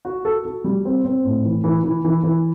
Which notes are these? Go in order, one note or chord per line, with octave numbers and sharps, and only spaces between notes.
F#4
A4
F#4
G3
C4
C4
A2
E3
E3
E3
E3
E3